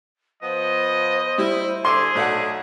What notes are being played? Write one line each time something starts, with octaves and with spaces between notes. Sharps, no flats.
F3 B3 C5 D#5
G3 E4
D3 G#4 C6 D6 E6
B1 A3 D5 F#5